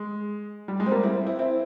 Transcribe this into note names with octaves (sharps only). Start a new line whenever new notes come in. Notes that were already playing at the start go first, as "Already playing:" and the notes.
Already playing: G#3
G3
G#3
C4
G3 A#3
C4 E4
C4 E4
C4 E4